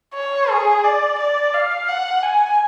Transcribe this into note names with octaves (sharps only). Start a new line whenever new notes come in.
C#5
G#4
D5
D5
F5
F#5
G#5